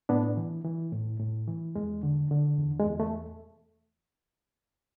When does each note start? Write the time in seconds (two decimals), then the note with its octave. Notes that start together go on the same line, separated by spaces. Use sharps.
0.09 A2 B3 D4
0.37 E3
0.64 E3
0.92 A2
1.20 A2
1.48 E3
1.75 E2 G#3
2.03 D3
2.31 D3
2.59 E2
2.80 G#3
2.86 E2
3.00 A3